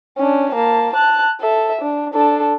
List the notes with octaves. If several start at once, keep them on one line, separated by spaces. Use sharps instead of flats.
C#4 D4
A#3 A5
A5 F#6
A4 E5
D4
D4 A4